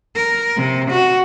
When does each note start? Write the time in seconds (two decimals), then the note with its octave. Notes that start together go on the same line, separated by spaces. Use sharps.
0.16 A#4
0.56 C3
0.91 F#4